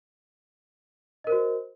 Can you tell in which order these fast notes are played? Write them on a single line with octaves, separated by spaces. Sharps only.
D#5 A#4 C5 F#4